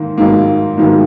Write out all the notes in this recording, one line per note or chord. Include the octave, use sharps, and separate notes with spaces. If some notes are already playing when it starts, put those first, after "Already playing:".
Already playing: G#2 D#3 A#3 D#4
G#2 D#3 F#3 A#3 D#4
G#2 D#3 F#3 A#3 D#4